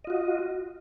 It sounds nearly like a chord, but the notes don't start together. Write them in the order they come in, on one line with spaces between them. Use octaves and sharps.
D#5 F4 F#4